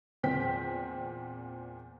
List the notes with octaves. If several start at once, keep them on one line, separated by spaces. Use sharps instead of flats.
E2 A#2 C4 G5 B6